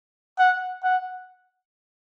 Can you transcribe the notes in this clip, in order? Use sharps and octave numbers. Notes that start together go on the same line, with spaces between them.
F#5
F#5